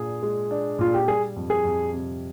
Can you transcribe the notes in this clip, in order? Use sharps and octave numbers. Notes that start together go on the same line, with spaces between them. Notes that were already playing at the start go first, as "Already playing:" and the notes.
Already playing: A#2 D4 G#4
G#3
D4
A#2 F4
G4
G3 G#4
F2
G#4
F2
C3